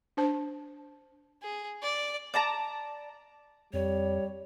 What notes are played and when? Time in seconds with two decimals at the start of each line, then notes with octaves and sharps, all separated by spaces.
0.17 D4 C5 A5
1.42 G#4
1.82 D5
2.34 D5 A5 A#5
3.73 F2 G3 C#5